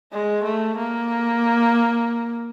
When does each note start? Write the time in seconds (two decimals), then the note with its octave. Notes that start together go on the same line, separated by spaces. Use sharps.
0.12 G#3
0.44 A3
0.77 A#3